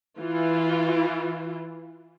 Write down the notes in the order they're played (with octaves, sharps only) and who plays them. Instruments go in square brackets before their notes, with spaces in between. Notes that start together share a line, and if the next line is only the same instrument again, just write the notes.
[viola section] E3 F4